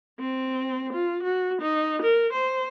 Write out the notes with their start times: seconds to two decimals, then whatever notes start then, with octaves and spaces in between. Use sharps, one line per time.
0.19 C4
0.93 F4
1.23 F#4
1.61 D#4
2.02 A#4
2.33 C5